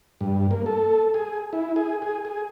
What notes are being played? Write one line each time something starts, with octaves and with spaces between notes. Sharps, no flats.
G2
A#3
A4
G#4
E4
G#4
G#4
G#4